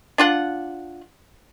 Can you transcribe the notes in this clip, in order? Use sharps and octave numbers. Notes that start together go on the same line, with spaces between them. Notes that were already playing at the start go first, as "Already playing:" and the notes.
D4 F4 F#5